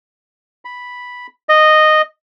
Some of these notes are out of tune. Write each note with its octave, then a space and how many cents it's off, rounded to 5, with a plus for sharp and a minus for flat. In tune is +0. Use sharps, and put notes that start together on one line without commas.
B5 -5
D#5 -10